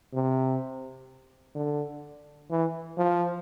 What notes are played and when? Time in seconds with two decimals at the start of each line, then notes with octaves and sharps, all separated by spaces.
0.14 C3
1.55 D3
2.51 E3
2.97 F3